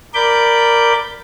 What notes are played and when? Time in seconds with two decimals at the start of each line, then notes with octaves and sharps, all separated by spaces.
0.14 A#4 D5 B5 D6 G6